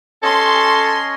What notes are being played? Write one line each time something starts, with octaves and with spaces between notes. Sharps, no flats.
C#4 A4 C#5 D#5 C6